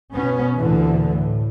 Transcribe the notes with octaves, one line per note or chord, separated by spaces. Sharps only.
B2 B3 C#4
D2 A#2 D3 E3
A2